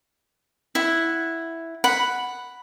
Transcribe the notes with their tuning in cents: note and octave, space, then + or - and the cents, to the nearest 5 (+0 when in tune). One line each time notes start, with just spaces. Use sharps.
E4 +0 F#5 +0
F#5 +0 B5 +0